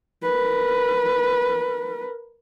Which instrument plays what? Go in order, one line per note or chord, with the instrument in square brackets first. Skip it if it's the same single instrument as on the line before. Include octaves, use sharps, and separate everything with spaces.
[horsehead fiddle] A#4 B4